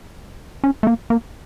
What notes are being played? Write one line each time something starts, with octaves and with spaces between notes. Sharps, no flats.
C#4
A3
A#3
A#3